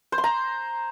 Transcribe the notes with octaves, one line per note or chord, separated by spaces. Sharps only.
C5
C6
A#5